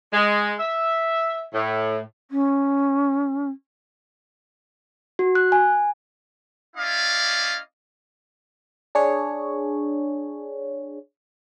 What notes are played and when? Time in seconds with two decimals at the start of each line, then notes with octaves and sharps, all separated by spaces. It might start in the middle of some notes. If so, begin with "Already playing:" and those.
0.12 G#3
0.59 E5
1.53 A2
2.31 C#4
5.19 F#4
5.35 F#6
5.52 G#5
6.76 C#4 E4 D5 D#5 F5
8.95 D4 G#4 C#5